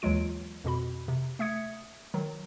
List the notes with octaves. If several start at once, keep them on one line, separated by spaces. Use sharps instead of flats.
D#2 E3 F#3 G#3 F4 D7
F2 B2 F#4 B5
C3
A3 E5 D#6 G#6 C#7
D#3 F#3